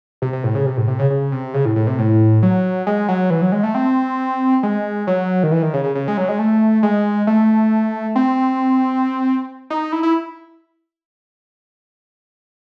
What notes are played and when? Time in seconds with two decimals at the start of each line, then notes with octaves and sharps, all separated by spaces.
0.22 C3
0.33 C3
0.44 A2
0.55 C#3
0.66 C3
0.77 A2
0.88 C3
0.99 C#3
1.10 C#3
1.32 C3
1.54 C#3
1.65 A2
1.76 A2
1.87 C3
1.99 A2
2.43 F#3
2.87 G#3
3.08 F#3
3.30 E3
3.42 F#3
3.52 G#3
3.63 A3
3.75 C4
4.63 G#3
5.07 F#3
5.43 D#3
5.52 E3
5.62 D#3
5.74 C#3
5.84 C#3
5.95 C#3
6.08 G#3
6.17 F#3
6.29 G#3
6.39 A3
6.83 G#3
7.27 A3
8.16 C4
9.70 D#4
9.92 E4
10.03 E4